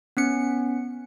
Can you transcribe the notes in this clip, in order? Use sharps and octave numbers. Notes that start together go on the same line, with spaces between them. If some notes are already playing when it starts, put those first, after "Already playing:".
B3 C#4 C#7